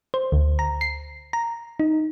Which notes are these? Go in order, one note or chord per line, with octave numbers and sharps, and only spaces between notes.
C5
D2
A#5
C7
A#5
D#4